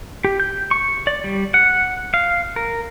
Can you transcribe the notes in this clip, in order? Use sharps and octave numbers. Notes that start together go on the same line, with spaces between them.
G4
G6
C#6
D5
G3
F#5
F5
A#4